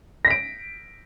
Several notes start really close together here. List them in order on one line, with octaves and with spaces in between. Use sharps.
A#6 B6 D7